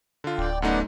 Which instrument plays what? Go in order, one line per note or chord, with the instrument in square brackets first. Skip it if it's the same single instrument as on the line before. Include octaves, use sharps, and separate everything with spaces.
[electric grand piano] D3 F4
[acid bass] D1 [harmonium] D5 G5
[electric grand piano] F#2 A3 D#4 [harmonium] B3 D5 F#5